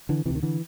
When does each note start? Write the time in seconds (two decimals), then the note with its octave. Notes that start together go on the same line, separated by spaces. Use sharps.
0.09 D3 E3
0.25 C3 E3
0.30 D2
0.35 D#3
0.43 D3 E3